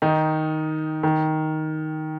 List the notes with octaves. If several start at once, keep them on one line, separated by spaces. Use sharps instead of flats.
D#3 D#4
D#3